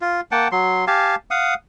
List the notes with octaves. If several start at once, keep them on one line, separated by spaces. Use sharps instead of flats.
F4
A#3 F#5 G5 A5
F#3 C6
G4 F5 G#5 A5
F5 F#5 D#6